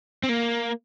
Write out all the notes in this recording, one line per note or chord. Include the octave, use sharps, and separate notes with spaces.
C4
A#3